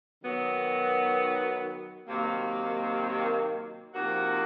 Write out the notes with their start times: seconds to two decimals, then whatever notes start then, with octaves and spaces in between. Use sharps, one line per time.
0.22 D#3 F#3 B3
2.08 C3 D#3 F#3 A#3
3.94 C3 F3 A#3 D#4 F#4